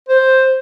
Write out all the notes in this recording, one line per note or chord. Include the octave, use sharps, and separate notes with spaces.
C5